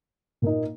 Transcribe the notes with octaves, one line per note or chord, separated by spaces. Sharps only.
A#2 A#3 D#4